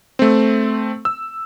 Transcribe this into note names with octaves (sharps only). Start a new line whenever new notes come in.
A3 C4
E6